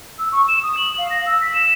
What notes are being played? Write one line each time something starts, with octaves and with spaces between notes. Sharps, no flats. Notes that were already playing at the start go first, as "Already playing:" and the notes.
E6
C#6
E7
D#6
F#7
F5
A#6
E6
B6
E7